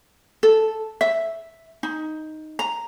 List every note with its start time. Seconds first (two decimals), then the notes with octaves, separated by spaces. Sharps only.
0.43 A4
1.01 E5
1.83 D#4
2.59 A#5